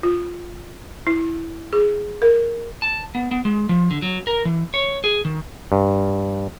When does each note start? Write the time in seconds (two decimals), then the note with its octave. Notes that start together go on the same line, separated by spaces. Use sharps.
0.03 F4
1.07 E4
1.73 G#4
2.22 A#4
2.82 A5
3.15 B3
3.31 B3
3.45 G#3
3.69 F3
3.91 D3
4.02 F#3
4.27 A#4
4.45 E3
4.74 C#5
5.04 G#4
5.25 D#3
5.72 G2